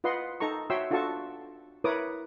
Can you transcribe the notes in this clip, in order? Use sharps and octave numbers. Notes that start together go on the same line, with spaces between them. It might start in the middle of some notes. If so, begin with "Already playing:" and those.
F4 B4 D#5 F#5 C6
D#4 A4 A#5 C#6
F#4 C#5 E5 G5 C6 E6
D4 F4 F#4 A4 A5 C#6
E4 A#4 B4 C#5 D6 D#6